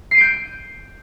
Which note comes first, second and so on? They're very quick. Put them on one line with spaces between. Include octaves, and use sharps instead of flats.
C7 D#7 D7 G6